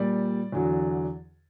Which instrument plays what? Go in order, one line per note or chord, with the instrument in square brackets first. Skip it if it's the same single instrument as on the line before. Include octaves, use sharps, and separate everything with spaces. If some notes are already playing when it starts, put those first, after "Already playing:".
Already playing: [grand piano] A#2 G3 D5
E2 D3 F#3